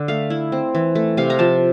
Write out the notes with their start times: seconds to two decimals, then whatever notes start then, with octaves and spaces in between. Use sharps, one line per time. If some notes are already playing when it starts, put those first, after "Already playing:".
Already playing: D3
0.08 A3 F5
0.30 E4
0.52 C4
0.75 E3
0.95 A3
1.17 C3 F5
1.30 A#5
1.39 F3 A5